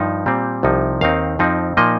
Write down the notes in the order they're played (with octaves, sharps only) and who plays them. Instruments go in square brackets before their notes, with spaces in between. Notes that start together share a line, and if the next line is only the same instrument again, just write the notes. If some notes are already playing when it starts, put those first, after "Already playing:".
Already playing: [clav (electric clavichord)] G2 F3 D#4
A#2 G3 C4
C2 C3 F3 D#4
D#2 D#3 C4 D#4 F5
F2 F3 C4 D#4
A#2 F3 A#3 D#4 D#5